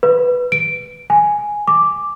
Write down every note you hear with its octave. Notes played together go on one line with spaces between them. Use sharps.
B4
D7
G#5
D6